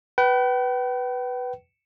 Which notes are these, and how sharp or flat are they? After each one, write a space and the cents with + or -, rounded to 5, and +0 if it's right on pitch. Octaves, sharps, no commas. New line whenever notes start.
B4 +0 G5 -40